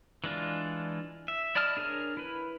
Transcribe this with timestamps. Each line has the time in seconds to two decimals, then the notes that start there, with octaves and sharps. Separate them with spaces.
0.24 E3 G#3 D4 F4
1.28 E5
1.55 E4 D5 D#5 A5 F6
1.77 D4 G#4 A#4 C#5 F6
2.17 E4 B4